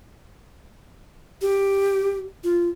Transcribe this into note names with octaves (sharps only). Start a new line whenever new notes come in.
G4
F4